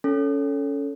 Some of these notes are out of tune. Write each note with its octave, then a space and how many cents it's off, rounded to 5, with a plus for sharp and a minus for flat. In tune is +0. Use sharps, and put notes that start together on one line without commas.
C#4 +15 A4 +0